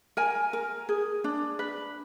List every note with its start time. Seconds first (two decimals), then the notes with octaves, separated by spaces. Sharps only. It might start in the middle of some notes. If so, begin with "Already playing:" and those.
0.17 A#4 G#5
0.53 A#4
0.89 G#4
1.24 D4
1.59 B4